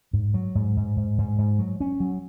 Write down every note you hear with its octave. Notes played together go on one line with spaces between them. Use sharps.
G#2
F#3
G#2
G#2
G#2
G#2
G#2
F#3
C#4
F#3